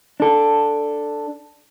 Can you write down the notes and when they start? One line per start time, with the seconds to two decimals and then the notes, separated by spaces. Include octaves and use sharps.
0.20 D4 A4